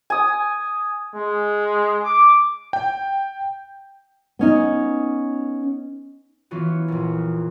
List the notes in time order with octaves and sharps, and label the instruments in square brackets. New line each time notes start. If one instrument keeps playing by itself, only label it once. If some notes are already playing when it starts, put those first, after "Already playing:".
[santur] G#5 D#6
[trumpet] G#3
D6
[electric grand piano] G5
[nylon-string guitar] B3 C#4 D#4
[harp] E3 B3 C#4 F4 F#4
A#1 F2